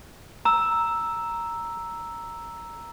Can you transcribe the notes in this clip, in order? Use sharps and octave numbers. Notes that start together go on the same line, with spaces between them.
A#5 E6